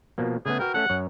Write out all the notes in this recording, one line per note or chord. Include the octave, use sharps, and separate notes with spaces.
B2 F3 A#3
C#3 A3 B3 G#4
F#4 A#4 B4 G5
A3 C#4 A4 F#5
F#2 C#5